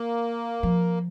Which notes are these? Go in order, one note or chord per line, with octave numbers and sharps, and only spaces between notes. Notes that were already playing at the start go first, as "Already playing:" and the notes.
Already playing: A#3
F3